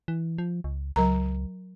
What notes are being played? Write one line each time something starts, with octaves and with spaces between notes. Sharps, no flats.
E3
F3
C#2
C#2 F#3 A#4 A#5